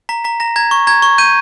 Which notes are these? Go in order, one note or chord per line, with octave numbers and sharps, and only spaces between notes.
A#5 B6
A#5 B6
A#5 A#6
A#5 G#6
C#6
A#5 G#6
C#6
G6 D#7